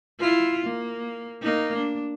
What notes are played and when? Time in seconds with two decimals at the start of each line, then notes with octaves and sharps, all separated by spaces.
0.20 E4 F4
0.67 A#3
1.42 A#3 D#4
1.76 D4